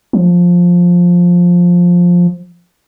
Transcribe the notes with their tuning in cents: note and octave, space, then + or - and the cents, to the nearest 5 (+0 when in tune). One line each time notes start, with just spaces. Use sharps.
F3 +10